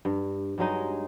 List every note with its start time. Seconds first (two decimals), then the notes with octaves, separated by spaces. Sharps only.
0.05 G2
0.58 G2 F#3 G#3 D#4